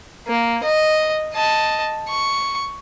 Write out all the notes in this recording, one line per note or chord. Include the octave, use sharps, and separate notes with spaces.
A#3
D#5
D#5 A5
C#6